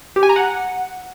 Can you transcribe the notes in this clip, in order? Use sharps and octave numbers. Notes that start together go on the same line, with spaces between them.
G4
G#5
A#5
F#5